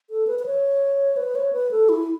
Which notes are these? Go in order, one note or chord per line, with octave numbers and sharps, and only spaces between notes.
A4
B4
B4
C#5
B4
C#5
B4
A4
E4